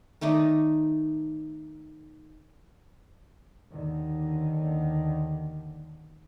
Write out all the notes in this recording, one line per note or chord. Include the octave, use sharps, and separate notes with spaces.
D#3 A3 D#4 D5
D#2 D3 D#3